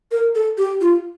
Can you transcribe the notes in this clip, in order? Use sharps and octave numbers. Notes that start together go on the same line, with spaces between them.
A#4
A4
G4
F4